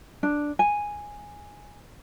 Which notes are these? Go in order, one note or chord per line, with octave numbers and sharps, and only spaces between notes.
D4
G#5